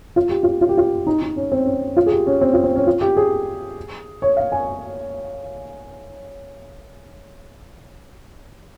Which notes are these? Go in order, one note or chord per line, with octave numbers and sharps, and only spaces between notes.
F4
G4
F4
F4
G4
F4
D#4
D#4
C#4
C4
C#4
F4
G#4
G4
C#4
C4
F4
C4
C#4
F4
G4
G#4
C#5
F5
G#5